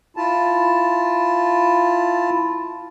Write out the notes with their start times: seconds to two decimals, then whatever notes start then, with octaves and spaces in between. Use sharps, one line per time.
0.17 E4 F4 A5